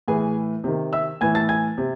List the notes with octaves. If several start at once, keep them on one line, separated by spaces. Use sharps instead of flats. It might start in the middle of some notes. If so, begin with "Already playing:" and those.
A2 E3 G#4 G#5
C3 D#3
E5 E6
A2 E3 G#5 G#6
A5 A6
G#5 G#6
C3